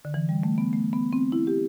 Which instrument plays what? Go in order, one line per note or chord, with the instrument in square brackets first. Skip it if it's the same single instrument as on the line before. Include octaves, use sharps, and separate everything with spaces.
[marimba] D3
E3
G3
A3
B3
A3
B3
C4
E4
G4